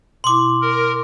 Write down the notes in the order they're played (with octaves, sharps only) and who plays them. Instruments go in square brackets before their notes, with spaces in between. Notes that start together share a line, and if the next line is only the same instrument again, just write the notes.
[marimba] B2 E4 [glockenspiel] C6 D6
[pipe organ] A#4